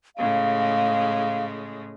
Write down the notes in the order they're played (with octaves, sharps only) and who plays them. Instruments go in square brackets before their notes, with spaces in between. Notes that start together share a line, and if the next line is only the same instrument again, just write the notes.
[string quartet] A2 C#3 G#3 [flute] F5